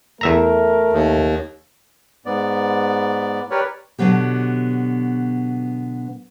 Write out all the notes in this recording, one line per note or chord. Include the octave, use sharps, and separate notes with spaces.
E2 A3 A#4 E5 A#5
D#2
G#2 B3 D5
G4 A#4 B4 C#5 D5
B2 D3 D#3 F#3 B3 G4